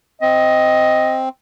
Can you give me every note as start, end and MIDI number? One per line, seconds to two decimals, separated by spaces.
0.22 1.29 60
0.22 1.23 75